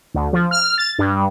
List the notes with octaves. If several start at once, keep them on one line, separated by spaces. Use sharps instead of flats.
D2
F3
F6
A6
G2